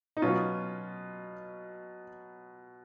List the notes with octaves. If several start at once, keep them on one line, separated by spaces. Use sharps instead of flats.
D#4
B2 F#3 B3 C#4 F4